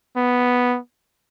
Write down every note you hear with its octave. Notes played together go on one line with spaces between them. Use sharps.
B3